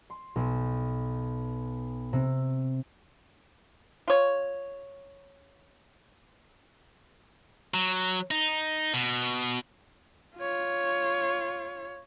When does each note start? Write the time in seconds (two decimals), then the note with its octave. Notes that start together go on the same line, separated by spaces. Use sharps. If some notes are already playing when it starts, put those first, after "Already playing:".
0.10 C6
0.36 B1
2.13 C3
4.08 F4 C#5
7.74 F#3
8.31 D#4
8.94 B2
10.37 F4 C#5